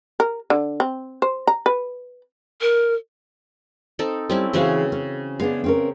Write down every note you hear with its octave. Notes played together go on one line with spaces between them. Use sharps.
A#4
D3
C4
C5
A#5
B4
A#4
C4 D#4 A4
G3 C4 C#4 E4
C#3 E3 G#3 C4 F#4 F5
C#4
G#3 B3 D4 F5
C4 C#4 A#4